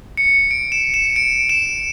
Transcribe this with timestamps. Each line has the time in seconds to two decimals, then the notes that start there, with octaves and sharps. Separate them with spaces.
0.17 C#7
0.51 D7
0.72 E7
0.94 E7
1.16 D7
1.49 E7